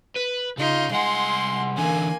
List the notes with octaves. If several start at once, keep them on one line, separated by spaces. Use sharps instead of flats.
B4
C#3 D#4 F4
C2 G#3 F#5 C6
D3 E3 A#3 G#5